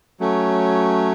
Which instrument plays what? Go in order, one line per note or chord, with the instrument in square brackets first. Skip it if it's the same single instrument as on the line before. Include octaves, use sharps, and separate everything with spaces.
[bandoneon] F#3 A3 C#4